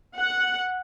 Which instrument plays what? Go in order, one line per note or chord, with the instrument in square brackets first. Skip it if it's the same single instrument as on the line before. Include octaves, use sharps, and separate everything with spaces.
[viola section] F#5